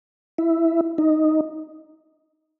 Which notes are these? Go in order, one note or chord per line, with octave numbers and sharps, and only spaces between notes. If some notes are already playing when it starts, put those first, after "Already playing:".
E4
D#4